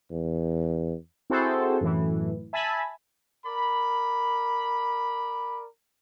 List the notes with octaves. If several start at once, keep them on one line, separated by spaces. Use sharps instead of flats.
E2
C4 E4 F#4 G#4 A4 C5
F#2 A2 E3
E5 G#5 A5 B5
A#4 D5 B5